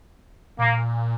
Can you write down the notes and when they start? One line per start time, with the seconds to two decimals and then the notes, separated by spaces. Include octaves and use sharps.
0.59 A#2 A#3